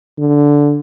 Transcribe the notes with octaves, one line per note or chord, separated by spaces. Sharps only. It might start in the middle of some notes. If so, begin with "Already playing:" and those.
D3